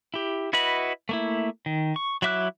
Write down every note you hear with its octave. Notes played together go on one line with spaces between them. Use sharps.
E4 G4
E4 F#4 B4 D#5 B5
A3 A#3 E4
D#3
C#6
F#3 E4 E5 D6 F#6